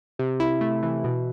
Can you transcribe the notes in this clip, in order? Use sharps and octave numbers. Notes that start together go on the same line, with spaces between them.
C3
E4
A3
E3
B2